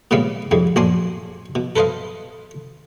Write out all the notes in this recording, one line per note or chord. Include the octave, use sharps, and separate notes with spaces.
A#2 C#3 G3 G#3 A#3 B3
F2 G#2 G3 G#3
A#1 F#2 D4 C5 G#5 C6
B2
A4 B4 C5 D#5 F5